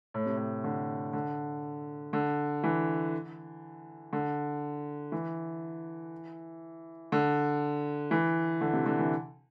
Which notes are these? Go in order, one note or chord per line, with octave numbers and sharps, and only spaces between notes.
A2
C3
A2
D3
D3
D3
E3
D3
E3
D3
E3
D3
C3
D3
E3